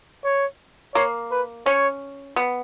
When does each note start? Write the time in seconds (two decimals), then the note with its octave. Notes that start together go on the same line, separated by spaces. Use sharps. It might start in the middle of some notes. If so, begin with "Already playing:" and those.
0.25 C#5
0.95 A#3 C#5
1.31 B4
1.66 C#4 C#5
2.36 B3